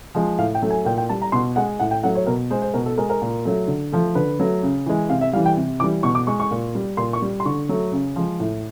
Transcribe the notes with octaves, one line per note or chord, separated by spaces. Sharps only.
F3 G#3
A2 F5
G5
F#3 A3
G#5
A#2 G5
G5
G3 A5
A#5
B2 C6
G#3 F#5
A2 F#5
G5
F#3 A3 F#5
C#5
B2 A#4
G#3 C5
C5
B2 A#4
A4
G#3 A#4
A#4
A#2
F#3 A3
D3
F3 A3
D3 B4
F#3 A3
C#3
E3 G#3
C3 F5
E5
E3 G3 F5
G5
C3
E3 G3 D6
B2 C#6
D6
G#3 C#6
C#6
A#2
G3
A#2 C6
C#6
G3
C6
D3 C#6
F#3 A3
C#3
F3 G#3
A2